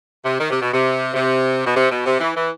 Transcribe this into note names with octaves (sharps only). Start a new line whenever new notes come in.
C3
D#3
C3
B2
C3
C3
B2
C3
B2
C3
E3
E3